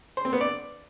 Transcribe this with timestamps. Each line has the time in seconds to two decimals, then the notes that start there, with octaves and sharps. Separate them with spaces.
0.17 C5
0.25 C4
0.33 B3
0.41 D5